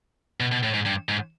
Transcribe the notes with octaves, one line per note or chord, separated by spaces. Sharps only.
B2
B2
A2
G#2
G2
G#2